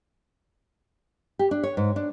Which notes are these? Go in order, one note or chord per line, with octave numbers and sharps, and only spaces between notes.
G4
D4
C#5
G#2
D4